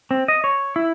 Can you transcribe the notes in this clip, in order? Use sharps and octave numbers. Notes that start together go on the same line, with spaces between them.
C4
D#5
C#5
E4